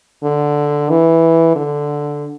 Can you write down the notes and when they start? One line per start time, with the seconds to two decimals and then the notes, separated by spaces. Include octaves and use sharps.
0.23 D3
0.89 E3
1.56 D3